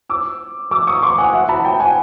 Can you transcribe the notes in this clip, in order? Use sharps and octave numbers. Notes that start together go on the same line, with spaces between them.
D6 E6
D6 E6
C#6 D#6
C6 D6
F#5 G#5
E5 F#5
A5 B5
G5 A5
F#5 G#5